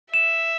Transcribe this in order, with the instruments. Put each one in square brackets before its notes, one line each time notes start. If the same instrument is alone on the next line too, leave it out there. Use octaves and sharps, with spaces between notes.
[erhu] E5 [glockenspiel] E7